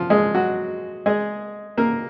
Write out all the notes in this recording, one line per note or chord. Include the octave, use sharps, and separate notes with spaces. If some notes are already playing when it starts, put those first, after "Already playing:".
Already playing: F3 F4
G#3 G#4
F#3 F#4
G#3 G#4
A#3 A#4